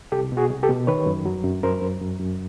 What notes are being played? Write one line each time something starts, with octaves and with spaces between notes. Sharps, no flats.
C2 G4 A4
B2
F#4 G#4
C2
G4 A4
B2
D#3 B4 C#5
F#2
F#3
F#2
F#2 A#4 C5
F#2
F#2
F#2